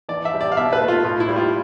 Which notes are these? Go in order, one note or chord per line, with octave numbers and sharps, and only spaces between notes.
E3 D5
E5
G3
D5
F5
B2 E5
B4
A3
F4
A2 F4
E4
G3
F4